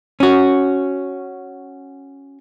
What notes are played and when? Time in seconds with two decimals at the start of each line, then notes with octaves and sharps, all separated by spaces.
0.20 C#4 F#4